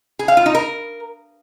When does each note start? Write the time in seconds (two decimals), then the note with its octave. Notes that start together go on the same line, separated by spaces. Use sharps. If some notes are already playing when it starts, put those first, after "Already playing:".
0.19 G#4
0.28 F5
0.37 F4
0.46 D#4
0.55 A#4